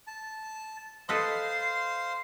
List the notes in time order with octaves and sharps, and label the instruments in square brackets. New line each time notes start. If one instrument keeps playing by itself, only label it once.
[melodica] A5
[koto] A4 B4 D#5 [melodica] C5 F5 C6